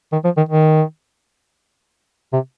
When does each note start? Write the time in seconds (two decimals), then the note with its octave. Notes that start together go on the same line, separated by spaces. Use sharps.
0.12 D#3
0.24 F3
0.37 D#3
0.49 D#3
2.33 C3